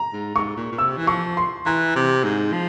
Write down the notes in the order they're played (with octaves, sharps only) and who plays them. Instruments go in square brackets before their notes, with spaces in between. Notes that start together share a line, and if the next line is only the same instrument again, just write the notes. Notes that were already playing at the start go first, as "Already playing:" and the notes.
Already playing: [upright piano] A#5
[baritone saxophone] G#2
[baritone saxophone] G#2 [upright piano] C#6
[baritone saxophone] A#2
A#2
[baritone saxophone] C3 [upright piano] E6
[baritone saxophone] E3
[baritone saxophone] F3 [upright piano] C#6
[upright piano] C6
[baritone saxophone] E3 [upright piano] A#5
[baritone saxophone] C3
G#2
F3